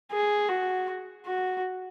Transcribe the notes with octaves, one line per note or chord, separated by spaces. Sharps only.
G#4
F#4
F#4